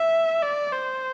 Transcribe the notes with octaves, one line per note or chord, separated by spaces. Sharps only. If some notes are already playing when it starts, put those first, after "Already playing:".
Already playing: E5
D5
C5